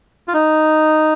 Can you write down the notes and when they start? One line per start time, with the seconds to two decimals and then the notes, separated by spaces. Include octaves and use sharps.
0.28 F4
0.34 D#4